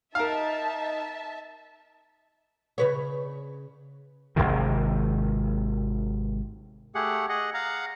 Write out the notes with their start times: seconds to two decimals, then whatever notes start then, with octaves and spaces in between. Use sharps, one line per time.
0.15 D#4 A#4 E5 F5 A5
2.78 C#3 B4 C#5
4.36 G#1 D2 C3 D#3
6.95 A3 G4 G#4 F#5
7.29 G#4 D#5 F#5
7.54 F5 F#5 A#5